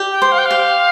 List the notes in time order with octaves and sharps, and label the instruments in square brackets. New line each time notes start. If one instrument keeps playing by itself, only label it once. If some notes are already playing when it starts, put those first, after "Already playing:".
Already playing: [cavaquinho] G4
[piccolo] G5
[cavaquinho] C5
[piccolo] F5
G5
[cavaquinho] G4 [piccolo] F5